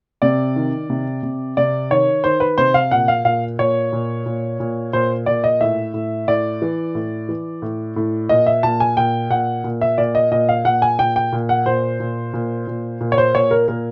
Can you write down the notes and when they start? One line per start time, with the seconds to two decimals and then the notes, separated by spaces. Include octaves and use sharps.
0.22 C3 D5
0.56 D#3
0.90 C3
1.23 C3
1.57 C3 D5
1.91 D#3 C#5
2.24 D#3 C5
2.40 B4
2.58 C3 C5
2.74 F5
2.91 A#2 F#5
3.08 F5
3.25 A#2 F5
3.59 A#2 C#5
3.92 A#2
4.26 A#2
4.60 A#2
4.93 A#2 C5
5.26 A#2 D5
5.44 D#5
5.61 A2 E5
5.94 A2
6.28 A2 D5
6.62 E3
6.95 A2
7.29 E3
7.62 A2
7.96 A2
8.29 A#2 D#5
8.47 E5
8.63 A#2 A5
8.80 G#5
8.97 A#2 G5
9.30 A#2 F#5
9.64 A#2
9.81 E5
9.98 A#2 D5
10.15 D#5
10.31 A#2 D#5
10.49 F5
10.65 A#2 F#5
10.82 G#5
10.99 A#2 G5
11.16 G5
11.32 A#2
11.49 F#5
11.66 A#2 C5
12.00 A#2
12.33 A#2
12.67 A#2
13.01 A#2
13.12 C#5
13.18 C5
13.34 A#2 C#5
13.51 A#4
13.68 A#2 A#4